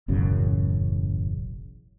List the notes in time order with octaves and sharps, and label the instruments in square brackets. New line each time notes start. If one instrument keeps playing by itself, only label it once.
[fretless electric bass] E1 A1 F#2 C#3